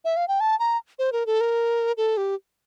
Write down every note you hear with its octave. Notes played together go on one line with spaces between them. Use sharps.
E5
F5
G5
A5
A#5
C5
A#4
A4
A#4
A4
G4